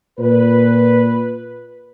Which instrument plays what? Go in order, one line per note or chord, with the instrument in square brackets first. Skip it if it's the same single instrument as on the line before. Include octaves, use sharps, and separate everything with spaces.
[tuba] A#2 [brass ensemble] B4